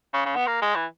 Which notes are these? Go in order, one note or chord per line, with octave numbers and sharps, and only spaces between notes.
C#3
C#3
B3
A#3
G#3
E3